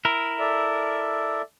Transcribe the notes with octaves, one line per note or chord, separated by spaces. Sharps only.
E4 A#4
A4 D5 E5